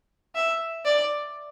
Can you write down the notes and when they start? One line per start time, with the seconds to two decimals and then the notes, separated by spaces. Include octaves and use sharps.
0.35 E5
0.85 D5